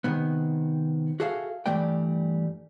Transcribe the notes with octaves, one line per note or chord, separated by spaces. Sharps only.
C3 D#3 B3
F#4 G#4 A4 E5 F5
G2 E3 G3 A3 D5 G5